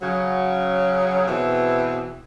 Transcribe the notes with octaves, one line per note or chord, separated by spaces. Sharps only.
C#3 F#3
B2 E3 C4 E4 G#4